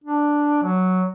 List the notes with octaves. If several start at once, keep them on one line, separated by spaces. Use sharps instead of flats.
D4
F#3